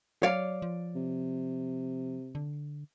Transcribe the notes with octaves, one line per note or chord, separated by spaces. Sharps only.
F#3 C#5 D5 F5
F3
C3
D3